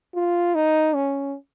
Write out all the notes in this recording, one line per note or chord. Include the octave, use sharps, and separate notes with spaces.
F4
D#4
C#4